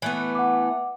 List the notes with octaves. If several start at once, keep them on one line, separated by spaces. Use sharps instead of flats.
E3 A3 B3
F#5 D6